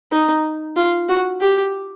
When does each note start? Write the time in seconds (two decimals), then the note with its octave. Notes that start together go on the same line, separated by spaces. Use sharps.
0.12 D#4
0.76 F4
1.08 F#4
1.40 G4